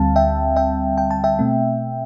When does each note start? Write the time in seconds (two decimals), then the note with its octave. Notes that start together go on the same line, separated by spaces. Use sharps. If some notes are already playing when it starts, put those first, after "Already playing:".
Already playing: D2 D3 G3 C4 F5 A5
0.16 E5 G5
0.56 E5 G5
0.98 G5
1.11 A5
1.24 E5 G5
1.39 B2 A3 C4